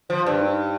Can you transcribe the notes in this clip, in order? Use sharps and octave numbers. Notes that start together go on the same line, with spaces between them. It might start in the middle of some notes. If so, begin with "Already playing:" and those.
F3 C5
G2
D#4